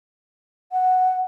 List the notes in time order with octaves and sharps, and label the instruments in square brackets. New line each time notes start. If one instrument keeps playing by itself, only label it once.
[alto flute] F#5